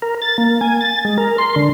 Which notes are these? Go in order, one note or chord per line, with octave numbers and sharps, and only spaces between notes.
A#4
A6
A#3
G#5
A6
G#3
A#4
C6
D3